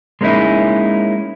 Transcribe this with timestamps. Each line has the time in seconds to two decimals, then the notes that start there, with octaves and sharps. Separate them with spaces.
0.21 G#3 A#3 C#4 D#4 E4